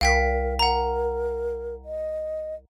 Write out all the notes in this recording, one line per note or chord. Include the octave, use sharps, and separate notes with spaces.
C2 A#4 F5 G5 B6
A#4 F#5 A#5
D#5